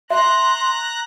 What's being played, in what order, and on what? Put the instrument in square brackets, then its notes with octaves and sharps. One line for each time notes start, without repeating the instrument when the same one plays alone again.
[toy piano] E5 [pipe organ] A#5 F#6 [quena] C6